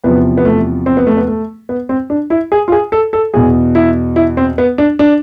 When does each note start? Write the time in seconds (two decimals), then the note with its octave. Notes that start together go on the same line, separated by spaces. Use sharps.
0.04 E2 C3 F3 B3
0.37 B3
0.45 A3
0.86 C4
0.97 B3
1.07 A3
1.17 B3
1.28 A3
1.69 B3
1.89 C4
2.10 D4
2.30 E4
2.52 G#4
2.68 F4
2.72 G#4
2.92 A4
3.13 A4
3.33 E2 B2 G#4
3.75 E4
4.16 E4
4.37 C4
4.58 B3
4.78 D4
4.99 D4